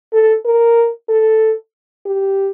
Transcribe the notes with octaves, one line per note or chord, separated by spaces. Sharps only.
A4
A#4
A4
G4